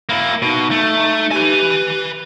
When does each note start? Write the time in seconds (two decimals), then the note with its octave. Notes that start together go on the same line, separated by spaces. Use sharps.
0.09 A#3 E4
0.42 B2 D#4
0.71 A3
1.31 G4 B4 G#5